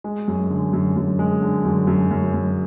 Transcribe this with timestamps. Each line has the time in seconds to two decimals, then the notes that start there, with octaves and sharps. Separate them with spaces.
0.04 G#3
0.28 F#2
0.50 D3
0.73 F#2
0.97 F#2
1.19 G#3
1.42 D3
1.65 F#2
1.87 F#2
2.11 F#2
2.34 F#2